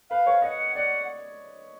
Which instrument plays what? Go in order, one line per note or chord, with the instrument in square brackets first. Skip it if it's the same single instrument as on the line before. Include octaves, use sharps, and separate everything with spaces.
[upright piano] B4 [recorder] F5
[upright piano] C#5
[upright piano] D#5 [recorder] F#5
[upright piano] D5 [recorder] F#5